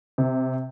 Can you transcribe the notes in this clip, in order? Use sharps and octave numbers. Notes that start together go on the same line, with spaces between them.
C3